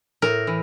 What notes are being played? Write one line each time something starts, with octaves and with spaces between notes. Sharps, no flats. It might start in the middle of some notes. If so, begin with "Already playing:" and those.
A2 A#4
E3